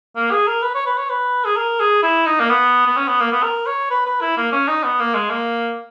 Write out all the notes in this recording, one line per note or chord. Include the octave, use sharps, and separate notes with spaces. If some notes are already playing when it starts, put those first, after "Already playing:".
A#3
G#4
A#4
B4
C#5
B4
C#5
B4
G#4
A#4
G#4
E4
D#4
A#3
B3
B3
C#4
B3
A#3
B3
A#4
C#5
B4
B4
E4
A#3
C#4
D#4
B3
A#3
G#3
A#3